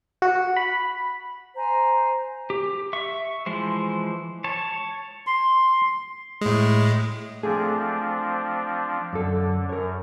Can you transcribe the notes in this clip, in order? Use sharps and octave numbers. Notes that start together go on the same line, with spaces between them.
F#4
B5
C5 G#5 A#5
G4
E5 C#6
E3 F3 G#3 C5
C#5 A5
C6
A2 G#3
F3 A3 C4 D4 G#4
F#2 D3 A4
F#2 A#4 C#5